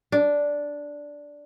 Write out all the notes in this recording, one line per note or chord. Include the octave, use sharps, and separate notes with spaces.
D4